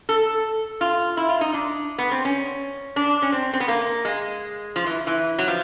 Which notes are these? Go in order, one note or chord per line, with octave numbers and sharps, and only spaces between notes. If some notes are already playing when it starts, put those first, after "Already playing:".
A4
F4
E4
F4
D#4
D4
B3
C4
C#4
D4
C#4
C4
C4
B3
A#3
G#3
F3
E3
E3
F#3
F3